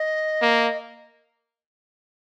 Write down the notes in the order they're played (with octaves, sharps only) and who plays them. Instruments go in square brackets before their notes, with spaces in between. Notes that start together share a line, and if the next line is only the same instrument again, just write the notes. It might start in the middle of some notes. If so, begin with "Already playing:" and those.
Already playing: [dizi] D#5
[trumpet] A#3